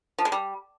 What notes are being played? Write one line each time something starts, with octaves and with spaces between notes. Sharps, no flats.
F3
G#3
G3